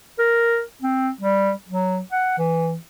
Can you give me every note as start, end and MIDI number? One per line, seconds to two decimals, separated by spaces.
0.19 0.62 70
0.82 1.11 60
1.21 1.52 55
1.68 2.00 54
2.12 2.34 78
2.38 2.75 52